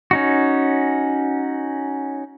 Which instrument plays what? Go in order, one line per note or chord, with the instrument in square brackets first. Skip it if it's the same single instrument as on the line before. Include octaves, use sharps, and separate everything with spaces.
[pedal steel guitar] C#4 D#4 F#4